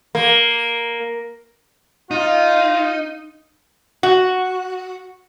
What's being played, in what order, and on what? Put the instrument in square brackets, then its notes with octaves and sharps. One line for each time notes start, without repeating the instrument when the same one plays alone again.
[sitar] A#3
[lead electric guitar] D#4 [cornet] F4
[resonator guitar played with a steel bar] F#4